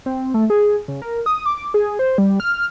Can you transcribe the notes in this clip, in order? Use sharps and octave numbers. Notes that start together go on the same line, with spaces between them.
C4
A3
G#4
C#3
A#4
D#6
D6
G#4
C5
G3
F6